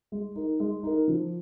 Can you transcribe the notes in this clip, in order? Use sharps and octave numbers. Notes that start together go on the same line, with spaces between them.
G#3
D#4 A#4
G#3
D#4 A#4
F3